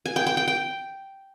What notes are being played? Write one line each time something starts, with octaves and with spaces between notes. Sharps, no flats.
G#5
G5
G5
G5
G5